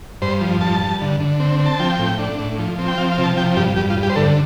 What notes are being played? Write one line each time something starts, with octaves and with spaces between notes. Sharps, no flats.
G2 C5
F3
G2 A5
G2
D3
D3
C4
C4
A5
F3 G5
A2
D4
A2
F3
C4
G5
F3 F5
F5
C3
A5
F3 G5
G2 G4
G2 G4
F4
G2
G4
C5
D3 A4